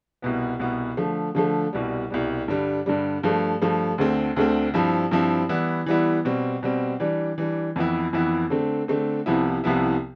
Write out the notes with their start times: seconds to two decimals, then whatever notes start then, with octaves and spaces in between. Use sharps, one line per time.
0.22 C2 B2 B3
0.60 C2 B2 B3
0.97 D3 F3 A3
1.35 D3 F3 A3
1.73 C2 B2 G3
2.10 C2 B2 G3
2.48 G2 D3 G3
2.86 G2 D3 G3
3.23 G2 F3 A3
3.62 G2 F3 A3
3.98 D2 D3 A3 C4
4.36 D2 D3 A3 C4
4.74 G2 F3 C4 E4
5.11 G2 F3 C4 E4
5.49 E3 G3 B3 E4
5.86 E3 G3 B3 E4
6.25 B2 G3 C4
6.63 B2 G3 C4
7.00 E3 G3 D4
7.38 E3 G3 D4
7.76 F2 E3 B3 E4
8.13 F2 E3 B3 E4
8.50 D3 A3 C4
8.88 D3 A3 C4
9.26 C2 C3 F3 B3 E4
9.64 C2 C3 F3 B3 E4